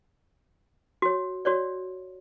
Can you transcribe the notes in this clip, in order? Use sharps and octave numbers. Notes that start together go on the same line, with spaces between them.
F#4 C#5
F#4 C#5 D5